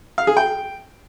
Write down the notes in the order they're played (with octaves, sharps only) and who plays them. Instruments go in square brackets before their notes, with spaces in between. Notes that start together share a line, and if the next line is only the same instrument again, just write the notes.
[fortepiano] F5
G#4
G5